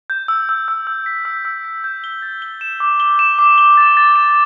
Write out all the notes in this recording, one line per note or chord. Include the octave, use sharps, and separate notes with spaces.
G6
E6
E6
E6
E6
B6
E6
E6
B6
G6
G7
A6
G7
E7
D6
G7
E7
D6
G7
A6
A6
E7